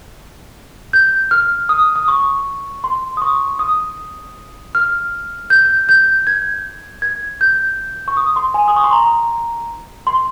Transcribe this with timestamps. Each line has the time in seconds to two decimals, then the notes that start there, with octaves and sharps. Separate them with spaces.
0.93 G6
1.31 F6
1.69 D#6
1.96 D#6
2.08 C#6
2.84 C6
3.17 D#6
3.22 C#6
3.59 D#6
4.75 F6
5.50 G6
5.89 G6
6.27 G#6
7.02 G#6
7.41 G6
8.08 C#6
8.17 D#6
8.36 C6
8.54 G#5
8.68 D#6
8.76 C#6
8.84 C6
8.93 A#5
10.07 C6